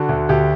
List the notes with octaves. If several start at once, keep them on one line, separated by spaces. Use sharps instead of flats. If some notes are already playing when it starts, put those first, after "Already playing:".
Already playing: D3 F#4
D2
D2 G4